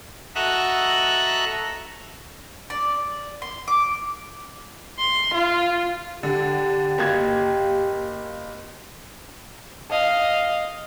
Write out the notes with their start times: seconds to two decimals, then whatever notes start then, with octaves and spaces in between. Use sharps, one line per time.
0.35 F#4 A4 D#5 E5 A#5 F#6
2.70 D5
3.42 C6
3.68 D6
4.98 C6
5.34 F4
6.23 D3 G4
6.98 F#1 A#3 G#6
9.90 D#5 F5